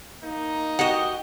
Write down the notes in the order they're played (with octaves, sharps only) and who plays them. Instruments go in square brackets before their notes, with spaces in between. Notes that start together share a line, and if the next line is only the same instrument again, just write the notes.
[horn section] A#3 D#4
[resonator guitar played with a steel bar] F#4 F#5 [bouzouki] G4 D#5